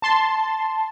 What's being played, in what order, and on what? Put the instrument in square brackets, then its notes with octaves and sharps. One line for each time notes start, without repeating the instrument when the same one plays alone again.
[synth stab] A5 C6